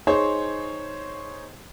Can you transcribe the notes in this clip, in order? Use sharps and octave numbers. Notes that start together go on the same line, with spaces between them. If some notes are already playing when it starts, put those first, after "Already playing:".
D#4 G#4 C5 C#5